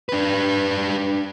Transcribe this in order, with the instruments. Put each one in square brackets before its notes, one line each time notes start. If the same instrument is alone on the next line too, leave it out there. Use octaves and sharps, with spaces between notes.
[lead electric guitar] D4 B4